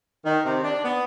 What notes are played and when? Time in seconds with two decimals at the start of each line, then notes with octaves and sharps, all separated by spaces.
0.25 D#3
0.45 C3
0.63 D4
0.84 B3